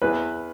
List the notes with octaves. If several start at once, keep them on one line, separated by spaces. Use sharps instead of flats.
E2 B4